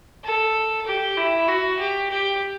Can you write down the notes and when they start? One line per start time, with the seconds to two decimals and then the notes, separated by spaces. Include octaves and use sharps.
0.24 A4
0.86 G4
1.17 E4
1.48 F#4
1.79 G4
2.10 G4